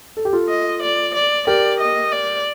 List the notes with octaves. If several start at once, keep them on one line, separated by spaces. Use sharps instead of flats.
A4
G4
F4 A4
D#5
D5
D5
G4 A#4 D5
D#5
D5